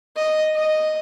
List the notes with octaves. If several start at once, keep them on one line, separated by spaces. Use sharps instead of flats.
D#5
D#5